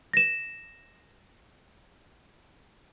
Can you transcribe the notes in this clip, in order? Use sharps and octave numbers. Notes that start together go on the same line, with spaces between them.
A#6 E7